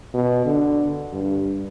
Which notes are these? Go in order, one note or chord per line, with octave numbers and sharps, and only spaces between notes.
B2
D3
G2